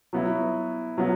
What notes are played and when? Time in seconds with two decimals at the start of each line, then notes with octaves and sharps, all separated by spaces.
0.13 F#3 B3 E4
0.98 F#3 B3